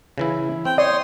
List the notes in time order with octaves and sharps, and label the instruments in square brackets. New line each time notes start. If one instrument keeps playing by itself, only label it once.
[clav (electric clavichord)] C#3 E3 E4
[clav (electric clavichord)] C4 [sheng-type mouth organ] G5
[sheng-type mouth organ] C#5 C6 D#6 [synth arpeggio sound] D5